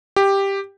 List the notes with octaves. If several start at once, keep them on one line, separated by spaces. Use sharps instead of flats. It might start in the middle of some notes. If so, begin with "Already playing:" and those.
G4